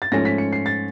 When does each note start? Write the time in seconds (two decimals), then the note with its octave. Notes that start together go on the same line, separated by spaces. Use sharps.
0.02 A6
0.12 G#2 F3 A3 C#4 A#6
0.25 B6
0.38 C#7
0.52 C7
0.66 A6